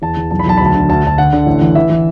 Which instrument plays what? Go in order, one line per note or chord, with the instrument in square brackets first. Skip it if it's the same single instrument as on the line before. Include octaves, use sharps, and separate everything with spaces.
[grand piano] E2 A5
E2
B1 A5
B5
B1 A5
D2 B5
A5
D3
D2 A5
D2 A5
D3 F#5
D3
A1
E3
E3 E5
E3